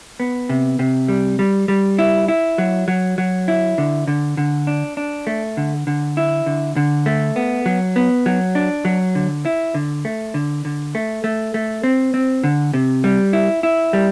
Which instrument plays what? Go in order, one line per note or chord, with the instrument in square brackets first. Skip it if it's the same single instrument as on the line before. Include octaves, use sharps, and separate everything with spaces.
[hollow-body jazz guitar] B3
C3
C3
G3
G3
G3
E4
E4
F#3
F#3
F#3
E4
D3
D3
D3
D4
D4
A3
D3
D3
E4
D3
D3
A3
B3
F#3
B3
F#3
D4
F#3
D3
E4
D3
A3
D3
D3
A3
A3
A3
C4
C4
D3
C3
G3
E4
E4
G3